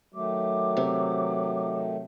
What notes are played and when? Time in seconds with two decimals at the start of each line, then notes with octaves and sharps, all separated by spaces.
0.14 D#3 F#3 A3 D6
0.77 C3